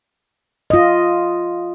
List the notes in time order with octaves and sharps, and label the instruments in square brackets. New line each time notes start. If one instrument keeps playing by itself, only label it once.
[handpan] F4 D#5